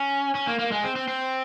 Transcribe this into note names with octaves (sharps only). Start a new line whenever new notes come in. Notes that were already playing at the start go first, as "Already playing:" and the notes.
Already playing: C#4
C#4
A#3
A#3
G#3
C4
C4
C4